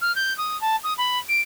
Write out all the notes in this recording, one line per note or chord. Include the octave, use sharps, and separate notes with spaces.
F6
G6
D#6
A5
D#6
B5
D7